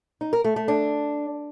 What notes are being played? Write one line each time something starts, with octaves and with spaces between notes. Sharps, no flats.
D#4
A#4
A3
A3
D4